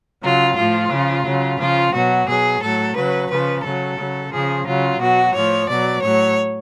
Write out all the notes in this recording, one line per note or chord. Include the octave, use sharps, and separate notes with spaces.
C#3 F#3 F4
A2 F3 F4
C#3 F3
C#3 F#3
C#3 F3 F4
B2 F#3 F#4
B2 F#3 G#4
A2 F#3 A4
C#3 F#3 B4
C#3 F3 B4
C#3 F#3 A4
C#3 F#3
C#3 F3 G#4
C#3 F#3 F4
B2 F#3 F#4
A2 F3 C#5
B2 F#3 D5
A2 F#3 C#5